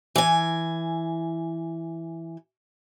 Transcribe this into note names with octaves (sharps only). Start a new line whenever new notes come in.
E3 G#5